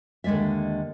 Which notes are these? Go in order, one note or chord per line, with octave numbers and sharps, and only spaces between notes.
D#2 D3 G#3 D5 E5